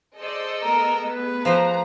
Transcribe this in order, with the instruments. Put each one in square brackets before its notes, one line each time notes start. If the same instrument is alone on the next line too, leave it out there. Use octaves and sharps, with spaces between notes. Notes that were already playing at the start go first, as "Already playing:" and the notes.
[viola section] G#4 C5 D5 [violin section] A4 D#5 E6
[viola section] A3 B3 G#4 [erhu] A#4
[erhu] B4
[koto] F3 C5 [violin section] A#5